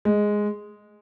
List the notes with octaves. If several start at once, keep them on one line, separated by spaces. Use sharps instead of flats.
G#3